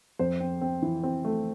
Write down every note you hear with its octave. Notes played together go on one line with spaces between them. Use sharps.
F2 C5
C4
C4
E3
C4
A3